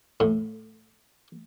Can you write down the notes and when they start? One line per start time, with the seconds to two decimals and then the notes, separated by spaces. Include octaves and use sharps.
0.20 A2